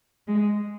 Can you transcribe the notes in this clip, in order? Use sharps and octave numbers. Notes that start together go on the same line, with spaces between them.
G#3